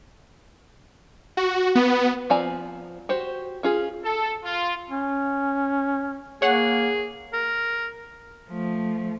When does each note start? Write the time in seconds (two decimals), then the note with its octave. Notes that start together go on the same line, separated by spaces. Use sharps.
1.37 F#4
1.75 B3
2.30 F3 C4 D5 G#5 A#5
3.09 F#4 G4 C5
3.63 C#4 F4 G#4
4.03 A4
4.44 F4
4.90 C#4
6.42 A#3 G#4 C#5 F#5
7.33 A#4
8.50 F3 A3